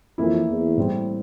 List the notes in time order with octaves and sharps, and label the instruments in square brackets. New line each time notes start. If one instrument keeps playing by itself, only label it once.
[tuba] F2 [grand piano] E3 A#3 E4
[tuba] E2
[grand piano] A2 G3 C4